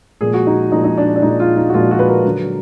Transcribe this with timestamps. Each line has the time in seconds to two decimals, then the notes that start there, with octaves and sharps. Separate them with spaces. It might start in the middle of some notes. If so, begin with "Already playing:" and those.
0.21 A#2 F3 G#3 G#4
0.34 F#4
0.47 D#4
0.72 A#2 F3 G#3 D#4
0.84 D#4
0.98 D4
1.16 D4
1.22 A#2 F3 G#3 D#4
1.40 F4
1.57 D#4
1.69 F#4
1.74 A#2 F3 G#3 F4
1.91 F#4
1.99 B4
2.08 A#4
2.25 D3 F#3